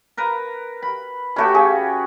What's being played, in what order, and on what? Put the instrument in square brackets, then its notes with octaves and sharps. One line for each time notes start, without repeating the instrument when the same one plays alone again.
[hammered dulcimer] A#4 B4 A#5
B5
[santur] A3 B5 [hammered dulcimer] C#4 F#4 G4
[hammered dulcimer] C#3 [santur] G#4